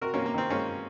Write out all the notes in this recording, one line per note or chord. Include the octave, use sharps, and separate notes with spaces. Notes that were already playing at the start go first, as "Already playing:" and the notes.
C3 F#4 A#4
A#3 C#4
C3
A#3
D#3 C4
G#3 A#3 C#4